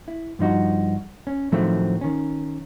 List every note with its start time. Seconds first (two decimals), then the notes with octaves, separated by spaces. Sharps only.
0.08 E4
0.39 G2 F3 D#4 F#4
1.27 C#4
1.52 A2 D#3 F3 F#3 A3 C4
2.01 D#3 C#4